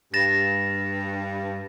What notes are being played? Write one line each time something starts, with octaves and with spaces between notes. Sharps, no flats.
G2 A6 A#6 E7